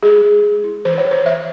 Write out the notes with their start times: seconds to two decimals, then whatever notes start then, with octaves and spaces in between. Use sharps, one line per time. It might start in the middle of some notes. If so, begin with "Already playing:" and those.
0.03 G#3 G#4
0.22 G#3
0.43 G#3
0.64 E4
0.85 E3 C5
0.98 C#5
1.05 E3
1.11 C5
1.26 E3 E5